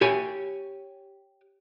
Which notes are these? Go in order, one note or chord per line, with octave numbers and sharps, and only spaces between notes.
G4 C#5 G#5